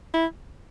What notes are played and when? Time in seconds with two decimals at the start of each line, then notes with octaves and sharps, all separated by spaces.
0.14 E4